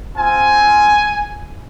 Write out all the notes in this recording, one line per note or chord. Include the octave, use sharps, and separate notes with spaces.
C4 F4 G#5